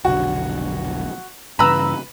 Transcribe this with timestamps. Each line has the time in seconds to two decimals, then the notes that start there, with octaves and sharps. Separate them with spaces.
0.05 F1 B1 D3 F#4
1.59 G2 C#3 E3 B4 A#5 B5 E6